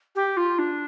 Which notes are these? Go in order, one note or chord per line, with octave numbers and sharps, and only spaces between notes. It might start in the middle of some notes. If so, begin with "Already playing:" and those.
G4
F4
D4